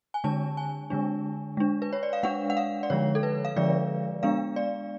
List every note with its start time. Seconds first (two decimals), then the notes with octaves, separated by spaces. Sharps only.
0.14 G#5
0.24 D3 G#3 D4 A5
0.57 G#5
0.90 D3 G#3 D4
1.57 G#3 D4
1.82 B4
1.93 C#5
2.03 D5
2.13 F5
2.23 G#3 D4 F#5
2.50 F#5
2.57 F5
2.83 D5
2.90 D3 F3 G#3 C#5
3.15 A4
3.23 B4
3.45 F5
3.56 D3 F3 G#3 D5
4.23 G#3 B3 D4 F5
4.56 D5